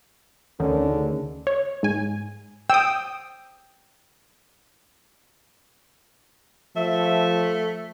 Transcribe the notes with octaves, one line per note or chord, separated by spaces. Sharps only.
D2 D3 D#3 C#4
C#3
C#5
G#2 G#5
G5 D#6 E6
F3 A3 E5